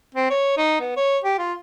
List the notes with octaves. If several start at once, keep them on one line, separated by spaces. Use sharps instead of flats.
C4
C#5
D#4
B3
C#5
G4
F4